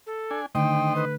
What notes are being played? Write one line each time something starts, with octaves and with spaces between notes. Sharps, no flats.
A4
D4 G#5
D3 D#3 A3 C5 D#5 G5
B4